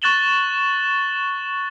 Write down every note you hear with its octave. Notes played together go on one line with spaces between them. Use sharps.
C#6 F#6 A6 E7 F#7 G7